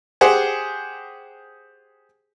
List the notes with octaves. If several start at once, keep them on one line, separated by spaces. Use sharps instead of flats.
G4 G#4 C5 F#5